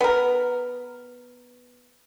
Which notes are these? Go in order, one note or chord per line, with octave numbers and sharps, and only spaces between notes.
B3 A#4